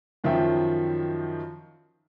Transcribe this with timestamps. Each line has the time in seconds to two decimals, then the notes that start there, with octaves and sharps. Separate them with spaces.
0.24 F#2 D#3 F3 E5 G5